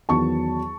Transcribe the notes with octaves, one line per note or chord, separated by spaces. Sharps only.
E2 D#3 F#3 B3 A5 C#6